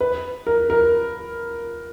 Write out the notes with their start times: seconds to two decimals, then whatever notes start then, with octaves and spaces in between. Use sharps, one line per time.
0.01 B4
0.47 A#4
0.70 A#4